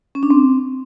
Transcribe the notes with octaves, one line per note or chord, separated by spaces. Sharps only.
C#4
D4
C4